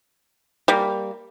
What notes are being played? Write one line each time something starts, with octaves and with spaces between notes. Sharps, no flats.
G3 A#3